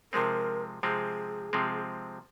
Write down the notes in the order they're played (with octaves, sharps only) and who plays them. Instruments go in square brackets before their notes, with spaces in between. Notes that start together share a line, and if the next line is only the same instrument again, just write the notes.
[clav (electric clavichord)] C3 F3 G#3 C4 [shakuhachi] A#4
[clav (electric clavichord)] C3 F3 G#3 C4 [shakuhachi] G#4
[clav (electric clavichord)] C3 F3 G#3 C4